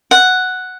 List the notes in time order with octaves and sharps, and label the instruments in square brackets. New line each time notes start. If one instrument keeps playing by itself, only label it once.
[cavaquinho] F#5